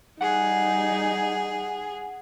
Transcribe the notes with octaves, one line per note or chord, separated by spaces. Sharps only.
G3 D#4 G#4 F#5